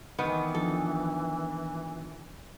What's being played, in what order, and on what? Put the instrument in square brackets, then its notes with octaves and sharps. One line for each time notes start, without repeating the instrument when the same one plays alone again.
[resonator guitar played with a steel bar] D#3 [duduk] E3 [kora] B3
[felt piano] F3 D4 [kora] A4